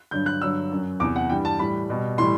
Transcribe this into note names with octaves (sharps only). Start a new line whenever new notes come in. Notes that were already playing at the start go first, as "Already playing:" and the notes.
G2 D3 F#3 G6
F#6
G2 D3 F#3 E6
F#2 F#3
E2 C3 E3 D6
F#5
G2 E3 G3 G5
A5
A2 E3 G3 B5
B2 G3
A2 E3 G3 C6